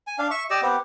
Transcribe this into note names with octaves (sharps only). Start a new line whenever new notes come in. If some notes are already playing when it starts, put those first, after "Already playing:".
G#5
D4 F5
E5 C#6
G4 D5 D#5 E6
B3 C4 G4